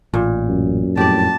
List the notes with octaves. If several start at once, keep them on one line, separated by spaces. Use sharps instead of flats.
A1 A#2
F#2
F2 A2 G4 D5 A5